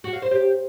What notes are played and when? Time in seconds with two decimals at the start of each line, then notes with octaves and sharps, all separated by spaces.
0.04 F#4
0.13 F5
0.22 C5
0.31 G4